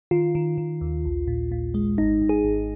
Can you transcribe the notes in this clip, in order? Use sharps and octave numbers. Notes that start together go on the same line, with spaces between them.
D#3 F4
D#3
D#3
D#2
A#1
A#2
A#2
G#3
G#1 D#4
G#1
G#4
G#1